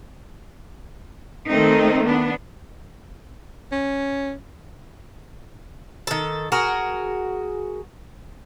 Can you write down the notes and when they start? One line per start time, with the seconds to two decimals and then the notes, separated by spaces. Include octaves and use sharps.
1.48 D#3 A3 C4 D#4
2.05 B3 D4
3.72 C#4
6.07 D#3 A4
6.52 F#4 G#4 A#4